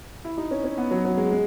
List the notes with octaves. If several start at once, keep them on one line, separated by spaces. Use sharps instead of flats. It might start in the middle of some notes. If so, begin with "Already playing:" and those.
E4
D#4
C#4
C#4
B3
F#3
F#3
G#3
G#3